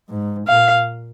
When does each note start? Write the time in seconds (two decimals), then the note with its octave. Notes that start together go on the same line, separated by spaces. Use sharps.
0.10 G#2
0.48 A#2 F5